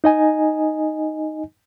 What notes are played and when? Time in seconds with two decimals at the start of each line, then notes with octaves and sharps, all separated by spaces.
0.04 D#4 D#5 G#5